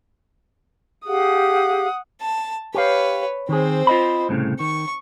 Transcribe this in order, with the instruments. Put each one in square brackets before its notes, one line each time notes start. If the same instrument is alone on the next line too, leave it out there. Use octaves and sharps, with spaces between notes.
[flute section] G4 G#4 F5 [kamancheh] F#5 D#6
[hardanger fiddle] A5
[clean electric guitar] G4 F5 [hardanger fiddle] B4 C#5
[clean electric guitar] D#3 G#4 [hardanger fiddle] C4 C5
[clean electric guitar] F4 D#5 B5
C2 A2 C#3
[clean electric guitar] D#3 [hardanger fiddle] C#6